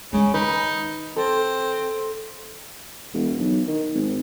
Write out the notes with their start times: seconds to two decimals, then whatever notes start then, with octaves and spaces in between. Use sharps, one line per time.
0.13 C#3 G#3 C#4
0.34 D#3 D#4 B4
1.16 C4 A4
3.14 E1
3.39 B1
3.68 D#3
3.94 G#1